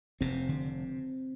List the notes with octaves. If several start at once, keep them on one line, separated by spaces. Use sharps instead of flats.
F1 C3 C4
D3